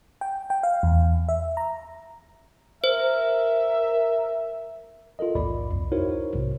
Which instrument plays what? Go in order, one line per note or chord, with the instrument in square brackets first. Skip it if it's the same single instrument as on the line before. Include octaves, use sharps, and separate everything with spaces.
[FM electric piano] G5
G5
F5
E2
E5
A#5
[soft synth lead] A#4 [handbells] C5 [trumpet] E5
[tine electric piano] F4 A4 A#4 D#5
A#1 D#2 G#2 D5 B5
C2 F2
D#4 E4 F#4 A#4 C5 C#5
B1 G#2 C3